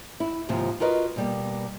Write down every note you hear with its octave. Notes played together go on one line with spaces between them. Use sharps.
E4
D#2 G#2 C3 F3
F4 F#4 A#4 B4 D#5
B2 G3 A#3